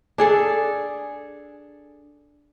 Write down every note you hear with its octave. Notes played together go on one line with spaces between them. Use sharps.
D4 G#4 A4